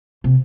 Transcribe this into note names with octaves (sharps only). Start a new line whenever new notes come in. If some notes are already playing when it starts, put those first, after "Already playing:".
C3